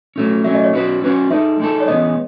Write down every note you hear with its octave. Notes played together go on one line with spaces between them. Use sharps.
F#3 A3 C#4
F#3 A3 C#4 E5
D#5
C#5
F#3 C#4 F#4 B4
F#3 C#4 F#4 B4
G#3 D#4 A4 E5
G#3 D#4 A4
C#5
C#3 E3 G#3 B3 D#5